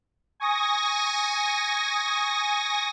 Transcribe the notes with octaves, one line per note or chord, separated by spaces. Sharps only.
G#5 C#6 D#6 A#6